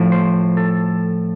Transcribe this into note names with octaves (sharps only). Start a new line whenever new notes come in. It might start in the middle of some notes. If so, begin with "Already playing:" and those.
Already playing: A2 F3
C5
A4